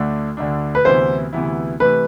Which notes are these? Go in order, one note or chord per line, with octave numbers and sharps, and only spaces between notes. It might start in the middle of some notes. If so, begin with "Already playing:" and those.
Already playing: D2 D3 A3 D4
D2 D3 A3 D4
B4
D2 C3 E3 B3 E4 C5
D2 C3 E3 B3 E4
C3 E3 A3 B4